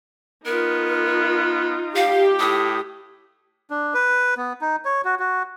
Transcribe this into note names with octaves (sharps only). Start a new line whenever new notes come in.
B3 D#4 F4 A#4
G4 F5
A2 D#6
D4
B4
B3
D#4
C#5
F#4
F#4